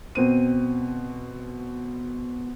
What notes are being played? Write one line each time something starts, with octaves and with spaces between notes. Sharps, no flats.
B2 C4 D#7